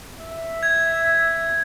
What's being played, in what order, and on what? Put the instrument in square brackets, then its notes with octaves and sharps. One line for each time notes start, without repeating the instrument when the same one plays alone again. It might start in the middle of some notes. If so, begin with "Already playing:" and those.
[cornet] E5
[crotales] G#6